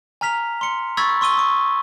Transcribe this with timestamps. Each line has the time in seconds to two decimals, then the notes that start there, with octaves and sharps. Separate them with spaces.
0.21 G#5 A#5 F6 B6 F7
0.61 C6 C#7
0.97 B5 C#6 E6 G#6 A6 B6
1.21 C6 C#6 E6 D#7 G7
1.37 C#6 D#6